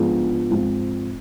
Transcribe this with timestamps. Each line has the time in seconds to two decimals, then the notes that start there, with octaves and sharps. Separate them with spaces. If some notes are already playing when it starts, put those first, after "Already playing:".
Already playing: G#2 F3 B3 D4 G#4
0.51 G#2 F3 G#3 C4 F4